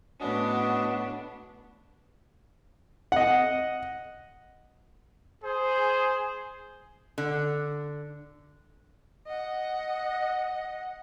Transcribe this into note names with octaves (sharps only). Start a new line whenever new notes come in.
A2 B3 C#4 D4 F#4 D#5
D#5 F#5
G#4 C5
D3
D#5 F#5